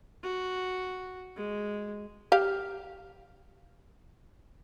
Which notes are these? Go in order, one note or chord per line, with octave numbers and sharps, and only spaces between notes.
F#4
G#3
G4 F5